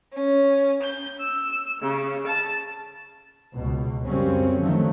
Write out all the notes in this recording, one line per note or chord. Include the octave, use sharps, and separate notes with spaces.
C#4
G6
E6
C#3
A5
C#2 B2
F#2 C#3 F#3 G3 C4 C#4
D3 D#3 F3 F#3 A3